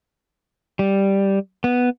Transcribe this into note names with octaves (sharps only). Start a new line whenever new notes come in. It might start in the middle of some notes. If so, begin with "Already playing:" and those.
G3
B3